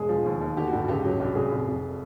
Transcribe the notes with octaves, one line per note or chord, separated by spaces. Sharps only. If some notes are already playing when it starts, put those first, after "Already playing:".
Already playing: E1 G#3 G#4
F3
D#2
D#2
D3 G4
F#4
G2
F#4
C#2 G4
F#3
C2 G4
C2 G#4
F1
F1